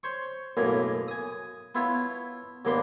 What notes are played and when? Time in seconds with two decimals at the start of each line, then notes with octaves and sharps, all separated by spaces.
0.03 C5 C#5 C#6
0.57 B1 F#2 A2 A#3 G#4 A#4
1.08 G#5 D#6
1.75 B3 E4 F4 C#5 A5
2.65 D#2 G#2 A#3 B3 D4 C6